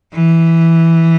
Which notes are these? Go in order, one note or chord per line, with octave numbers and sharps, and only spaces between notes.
E3